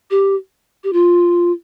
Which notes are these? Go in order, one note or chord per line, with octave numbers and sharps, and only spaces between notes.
G4
G4
F4